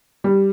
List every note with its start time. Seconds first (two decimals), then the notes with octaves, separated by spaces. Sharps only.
0.24 G3